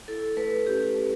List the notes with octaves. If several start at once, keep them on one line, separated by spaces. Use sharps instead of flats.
E4 A4
A3 B4
C#4 G4
A3